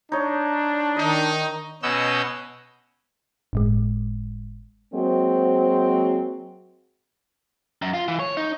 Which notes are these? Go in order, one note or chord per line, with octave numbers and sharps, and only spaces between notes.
D4 D#4 C#5
D#3 D#4 D#5
B2 B3 C#4 D#5 E6 G6
G1 A2 G#3
F#3 G#3 A#3 C4 F#4 C5
F#2
F4
E3
C#5
D#4